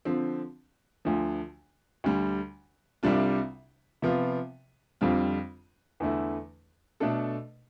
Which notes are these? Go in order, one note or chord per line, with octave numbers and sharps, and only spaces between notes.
D3 F3 C4
D2 D3 F3
D2 D3 G3
C2 C3 G3 D4 F4
C3 F3 B3 F4
F2 D3 G3 C4 F4
E2 D3 A3 E4
B2 A3 D4 A4